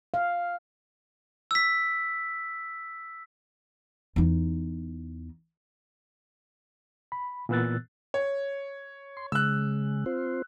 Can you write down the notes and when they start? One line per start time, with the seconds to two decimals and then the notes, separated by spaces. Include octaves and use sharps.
0.14 F5
1.51 E6 B6
4.16 E2 D#4
7.12 B5
7.49 A#2 E3 B3 E6 F#6 A6
8.14 C#5
9.17 C6
9.32 C#3 G#3 E6 F#6
10.06 C4 F4 C5